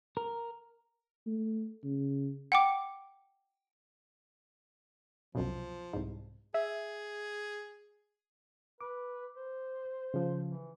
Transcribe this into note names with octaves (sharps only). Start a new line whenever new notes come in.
A#4
A3
C#3
F#5 G5 D6
C2 F#2 B2 F3
C2 G#2
G#4 E5
B4 D6
C5
C#3 F3
E3